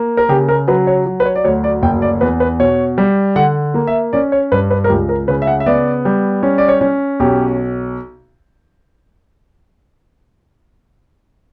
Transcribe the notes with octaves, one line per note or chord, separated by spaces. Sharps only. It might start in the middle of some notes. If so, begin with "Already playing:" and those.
Already playing: A#3
A#4
C#3 G4
A#4
F#3 B4
C#5
F#3
B4
C#5
D5
D2 C#5
D5
F#1 G5
D5
E2 B4
B4
B2 C#5
G3
D3 F#5
A#3
E5
C#4 D5
C#5
G2 B4
B4
A#4
C#2 G4
A#4
C#3 B4
E5
F#5
E5
B3 D5
G3
C#4
D5
C#5
C#4
B1 G4